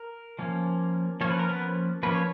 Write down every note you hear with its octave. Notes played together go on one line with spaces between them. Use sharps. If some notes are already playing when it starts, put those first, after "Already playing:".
Already playing: A#4
F3 A#3 C#4
F3 A#3 C#4 C#5
B4
A#4
B3 B4
F3 A#3 C#4 B4
C#5